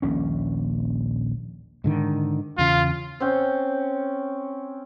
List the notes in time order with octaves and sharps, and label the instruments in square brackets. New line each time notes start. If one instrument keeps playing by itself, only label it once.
[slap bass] D#1 A#1 A#2 C#4
[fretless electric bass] G#2 D3 D#3
[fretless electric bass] E2 C#3 [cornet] F4
[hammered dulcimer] C4 C#4 G5